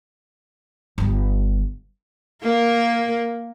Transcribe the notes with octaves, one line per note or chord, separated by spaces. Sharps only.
G1 G3
A#3 A#4